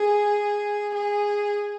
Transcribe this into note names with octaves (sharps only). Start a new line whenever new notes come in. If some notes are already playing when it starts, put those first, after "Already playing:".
Already playing: G#4
G#4